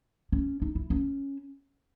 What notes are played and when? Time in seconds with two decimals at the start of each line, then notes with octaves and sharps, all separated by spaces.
0.32 C#4
0.62 D#4
0.75 E4
0.90 C#4